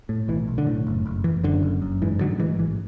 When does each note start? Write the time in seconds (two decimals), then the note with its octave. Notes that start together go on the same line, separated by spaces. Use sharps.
0.09 A2
0.28 B1 E3
0.48 B1
0.58 D3
0.67 A2
0.87 F#1
1.06 F#1
1.24 F#1 E3
1.44 F#2 D3
1.63 F#1
1.82 F#2
2.02 G#2 E3
2.20 A1 D3 F#3
2.40 G#2 E3 G#3
2.59 A1 E3